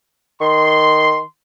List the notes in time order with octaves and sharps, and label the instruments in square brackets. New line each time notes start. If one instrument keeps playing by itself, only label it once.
[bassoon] D#3 [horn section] C6